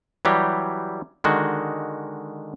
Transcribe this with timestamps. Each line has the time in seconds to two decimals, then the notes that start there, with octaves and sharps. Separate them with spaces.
0.25 E3 F#3 G3 G4
1.24 D3 D#3 G#3 F#4